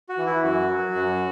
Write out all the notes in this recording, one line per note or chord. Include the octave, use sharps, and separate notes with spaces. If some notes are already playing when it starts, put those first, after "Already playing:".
F#4
E3
E4
F#2 F#4
F#3
F#2